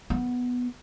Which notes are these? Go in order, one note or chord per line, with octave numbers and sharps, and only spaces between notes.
B3